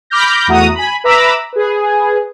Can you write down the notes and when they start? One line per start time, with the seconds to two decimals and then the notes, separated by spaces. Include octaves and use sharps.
0.10 B5 D6 F6 G6 A#6
0.47 E2 A3 F#4 A#5 D#6
0.74 G#5 B5
1.04 B4 E5 A#5 B5 D6 E6
1.53 G#4 B4